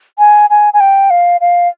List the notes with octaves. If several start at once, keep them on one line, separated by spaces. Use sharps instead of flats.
G#5
G#5
G#5
G5
F5
F5